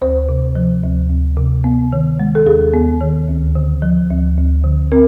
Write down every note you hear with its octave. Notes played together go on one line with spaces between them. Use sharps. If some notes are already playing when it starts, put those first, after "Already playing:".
D2 C5
C3
F3
D2
D2
C3
B3
D#3
G#3
A4
D#2 G#4
B3
D#3
D2
D3
F3
D2
D2
D3
C4 A#4